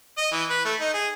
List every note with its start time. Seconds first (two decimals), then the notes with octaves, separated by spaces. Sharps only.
0.18 D#5
0.32 E3
0.50 B4
0.65 A3
0.80 D#4
0.94 G#4